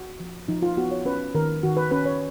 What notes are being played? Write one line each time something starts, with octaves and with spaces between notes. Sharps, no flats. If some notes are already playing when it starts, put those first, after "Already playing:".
Already playing: F#4
F3
F3 D#4
F4
B3 F#4
C#5
C#4 B4
D#3 A#4
D#3 F#4
B4
C#4 B4
C#5